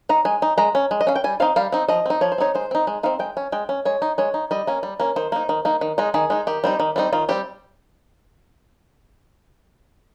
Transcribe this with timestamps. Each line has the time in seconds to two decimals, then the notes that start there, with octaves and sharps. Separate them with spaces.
0.09 D#4 A#5
0.25 G#3 G#5
0.42 D#4
0.58 G#3 A#5
0.75 C#4
0.91 G#3
1.01 D#5
1.07 C#4 F5
1.16 G5
1.24 G3 G#5
1.40 C4 D#4 F5
1.56 G3 F5
1.72 C4 D#4
1.88 F3 D#5
2.06 C4 D#4
2.21 F3 C#5
2.32 C5
2.38 C4 D#4 C#5
2.55 G#3 C5
2.71 C4 D#4
2.87 G#3
3.03 C4 D#4 F5
3.19 G#3 G5
3.37 C#4
3.52 G#3 G5
3.69 C#4
3.85 G#3 C#5
4.02 D#4
4.18 G#3 C#5
4.34 D#4
4.51 G3 D#5
4.67 A#3 C#4
4.83 G3
5.00 A#3 C#4
5.16 D#3 C5
5.32 A#3 D#4
5.49 D#3
5.65 A#3 D#4
5.81 D#3
5.98 G#3 D#4
6.14 D#3 G#4
6.30 G#3 D#4
6.47 D#3 G4
6.64 G3 C4 D#4
6.80 D#3
6.96 G3 C4 D#4
7.13 D#3 F4
7.29 G3 C4 G4